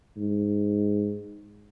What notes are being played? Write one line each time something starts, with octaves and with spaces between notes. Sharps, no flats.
G#2